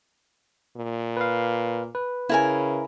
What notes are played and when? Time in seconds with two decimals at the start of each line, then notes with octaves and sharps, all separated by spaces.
0.77 A#2
1.17 B4 F5
1.95 B4
2.29 C#3 E4 A#4 G#5